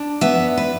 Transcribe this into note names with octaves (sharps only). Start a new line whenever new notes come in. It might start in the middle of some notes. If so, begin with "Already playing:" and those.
Already playing: D4
B3 E5
B4